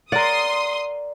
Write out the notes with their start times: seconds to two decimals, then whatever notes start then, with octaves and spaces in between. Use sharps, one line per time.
0.12 A#4 D5 F#5 C6 D#6